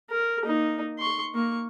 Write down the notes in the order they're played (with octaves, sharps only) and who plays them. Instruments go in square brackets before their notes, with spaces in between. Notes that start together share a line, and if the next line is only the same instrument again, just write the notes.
[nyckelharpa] A#4
A#3 D#4
C6 C#6
A#3 C#6